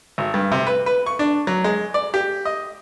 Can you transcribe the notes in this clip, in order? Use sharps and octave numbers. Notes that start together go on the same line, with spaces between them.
G#1
G2
C3
B4
B4
C#6
D4
F#3
G#3
D5
G4
D#5